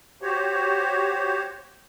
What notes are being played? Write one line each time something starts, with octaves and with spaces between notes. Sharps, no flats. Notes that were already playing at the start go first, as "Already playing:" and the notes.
F#4 G4 C5 C#5